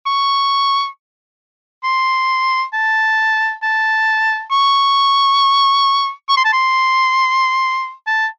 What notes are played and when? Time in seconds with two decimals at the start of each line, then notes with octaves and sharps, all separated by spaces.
0.06 C#6
1.84 C6
2.73 A5
3.63 A5
4.51 C#6
6.29 C#6
6.37 C6
6.45 A5
6.53 C6
8.07 A5